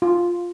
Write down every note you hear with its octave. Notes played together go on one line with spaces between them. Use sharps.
F4